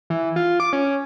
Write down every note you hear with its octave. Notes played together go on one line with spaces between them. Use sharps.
E3
F4
D6
C#4